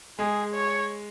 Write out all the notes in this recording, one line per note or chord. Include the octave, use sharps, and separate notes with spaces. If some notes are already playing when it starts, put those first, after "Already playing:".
G#3 G#4
C#5